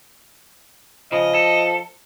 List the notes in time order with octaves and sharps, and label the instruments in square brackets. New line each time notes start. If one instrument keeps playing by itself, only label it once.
[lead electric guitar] C#3 [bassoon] F3 [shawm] D#5
[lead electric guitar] A4